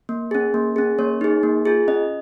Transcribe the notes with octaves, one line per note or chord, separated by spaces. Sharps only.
A#3
C#4 G#4
A#3
C#4 G#4
A#3 C#5
D#4 G#4
A#3
F4 G#4
C#4 D#5